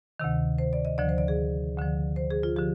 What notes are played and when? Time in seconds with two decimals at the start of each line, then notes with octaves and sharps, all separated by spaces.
0.20 D2 C3 D#3
0.58 C5
0.73 D5
0.85 D#5
0.98 D2 D3 F3 D5
1.09 C5
1.18 D5
1.28 G#4
1.77 D2 D3 F3
2.16 C5
2.31 G#4
2.43 F4
2.56 D3 F3 G4